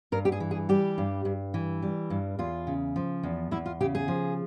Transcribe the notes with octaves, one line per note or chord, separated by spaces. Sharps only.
G2 A#4
G4
G#4
E3
G#4
G3 G4
G2
G2
E3
G3
G2
E2 F4
C#3
F3
E2
E2 E4
F4
C#3 G4
G#4
F3